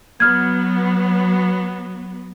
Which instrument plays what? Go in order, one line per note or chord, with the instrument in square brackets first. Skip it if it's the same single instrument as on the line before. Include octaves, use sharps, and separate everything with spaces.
[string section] F#3 B3 [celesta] F6 G#6